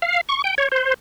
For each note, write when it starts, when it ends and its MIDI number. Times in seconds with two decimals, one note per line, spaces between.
0.02 0.21 77
0.29 0.42 85
0.44 0.55 79
0.58 0.68 73
0.72 0.94 72